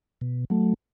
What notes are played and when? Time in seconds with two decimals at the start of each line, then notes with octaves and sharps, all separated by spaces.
0.21 B2
0.50 F#3 A3